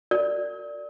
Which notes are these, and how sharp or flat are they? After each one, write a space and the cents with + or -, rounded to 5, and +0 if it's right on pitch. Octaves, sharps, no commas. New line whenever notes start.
A#4 -30 D5 +0